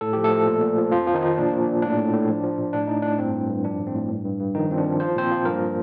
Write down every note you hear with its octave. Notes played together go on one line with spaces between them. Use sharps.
A2 A4
F3 G4
A3 A4
F3
A#2
A#2
F3
F2 F3 F4
F3
D#3 D#4
F3
A#2 D4
A#2
A#2
A2 D4
A2
A2
F3
F3
A#2
A2 D4
A2 D#4
A2 D4
G2 C4
G2
G2
F3 D4
A2
C4
A2
G2
G2
G2
D#3 F3 D#4
F3 C4
D4
F3
F3 C5
A#2 C4 C5
F3
G2 A#3 A#4